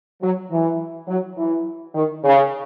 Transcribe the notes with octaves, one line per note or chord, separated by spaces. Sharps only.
F#3
E3
F#3
E3
D#3
C#3